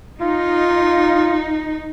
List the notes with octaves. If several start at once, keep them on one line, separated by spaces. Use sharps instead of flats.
D#4 F4